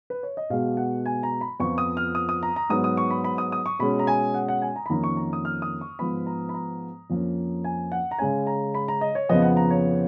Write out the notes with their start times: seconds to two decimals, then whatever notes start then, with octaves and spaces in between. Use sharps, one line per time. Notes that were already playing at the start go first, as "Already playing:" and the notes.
0.10 B4
0.23 C#5
0.37 D#5
0.50 B2 G#3 B3 F5
0.77 F#5
1.06 G#5
1.23 A#5
1.41 B5
1.60 F2 F3 B3 C#6
1.78 D#6
1.97 F6
2.15 D#6
2.29 D#6
2.43 A#5
2.56 A#5
2.70 G#2 F#3 B3 D#6
2.84 D#6
2.97 C#6
3.11 B5
3.24 B5
3.38 D#6
3.52 D#6
3.66 C#6
3.79 B2 G#3 C#4 B5
3.99 A#5
4.07 G#5
4.34 F#5
4.48 F#5
4.62 G#5
4.76 A#5
4.86 B5
4.90 F2 D#3 A#3 C#4 A#5
5.04 C#6
5.17 A#5
5.33 D#6
5.45 F6
5.62 D#6
5.81 C#6
5.99 G#2 F3 B3 B5
6.26 A#5
6.49 B5
6.54 A#5
7.10 F2 F3 A#3 C#4
7.64 G#5
7.92 F#5
8.11 A#5
8.19 C#3 G#3 C#4 G#5
8.47 A#5
8.75 B5
8.88 A#5
9.01 D#5
9.15 C#5
9.29 F2 C#3 F3 B3 D#5
9.42 F#5
9.57 A#5
9.70 C#5